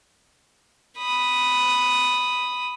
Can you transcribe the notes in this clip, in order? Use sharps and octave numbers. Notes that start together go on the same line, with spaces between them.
B5 D#6